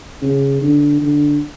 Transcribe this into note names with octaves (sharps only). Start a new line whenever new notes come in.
C#3
D3
D3